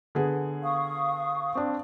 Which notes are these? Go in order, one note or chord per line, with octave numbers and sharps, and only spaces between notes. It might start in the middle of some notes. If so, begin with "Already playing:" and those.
D3 B3 G#4
F5 C#6 D#6
C4 D4